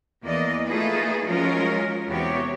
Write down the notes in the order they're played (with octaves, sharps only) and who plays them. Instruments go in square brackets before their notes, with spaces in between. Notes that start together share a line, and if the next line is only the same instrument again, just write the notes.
[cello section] E2 E3 A#3 D5 D#5
A3 A#3 D#4 F4 G#4 B4
F3 F#3 G#3 C#4 F4 A#4
E2 C3 B3 F#4 G4 C#5